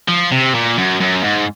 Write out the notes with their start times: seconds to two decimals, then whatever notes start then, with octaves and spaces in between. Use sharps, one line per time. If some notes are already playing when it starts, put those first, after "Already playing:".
0.08 F3
0.32 C3
0.54 A#2
0.77 F#2
1.00 F#2
1.23 G#2